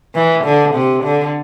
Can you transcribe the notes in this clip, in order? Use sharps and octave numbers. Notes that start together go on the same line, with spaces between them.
E3
D3
C3
D3